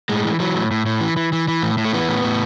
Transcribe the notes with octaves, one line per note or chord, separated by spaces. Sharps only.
A2 G#3
E3
E3 F#3
A2
A2
A2
E3
E3
E3
E3
A2
A2
A3
E3 B3
A2
A2